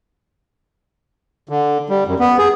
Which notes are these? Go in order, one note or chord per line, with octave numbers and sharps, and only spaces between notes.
D3
G3
F#2
B3
G#4